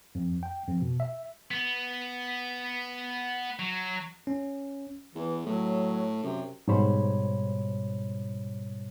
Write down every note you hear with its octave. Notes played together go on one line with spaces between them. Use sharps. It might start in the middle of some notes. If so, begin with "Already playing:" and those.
F2
G5
F2
B2
E5
B3
F#3
C#4
E2 E3
A2 F#3
F#2 C3
G#2 B2 G3 C5 C#5 B5